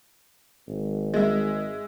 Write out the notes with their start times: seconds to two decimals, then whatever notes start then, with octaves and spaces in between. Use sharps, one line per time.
0.68 G#1
1.14 G#3 E5